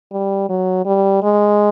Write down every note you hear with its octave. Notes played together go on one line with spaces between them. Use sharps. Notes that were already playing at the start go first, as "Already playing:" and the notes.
G3
F#3
G3
G#3